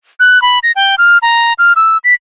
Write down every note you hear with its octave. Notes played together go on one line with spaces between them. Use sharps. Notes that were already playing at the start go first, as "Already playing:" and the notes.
F#6
B5
A#6
G5
F6
A#5
F6
E6
B6